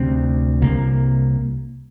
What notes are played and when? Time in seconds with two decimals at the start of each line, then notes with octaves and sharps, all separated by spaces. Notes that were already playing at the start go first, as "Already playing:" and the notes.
Already playing: D2 C3 C4
0.62 C2 C3 A#3